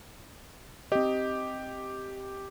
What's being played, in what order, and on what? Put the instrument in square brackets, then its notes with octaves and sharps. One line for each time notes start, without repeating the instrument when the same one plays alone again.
[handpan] C4 D#5 [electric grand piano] G4